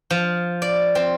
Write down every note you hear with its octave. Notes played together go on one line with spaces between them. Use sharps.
F3
D5
C4